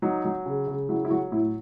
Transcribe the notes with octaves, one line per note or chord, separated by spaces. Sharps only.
F#3 D#4
F#3
C#3
C#3
F#3 E4
E4
F#3 F#4
A2 E4